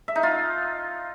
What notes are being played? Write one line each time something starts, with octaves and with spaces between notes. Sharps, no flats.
E5
D#4
F4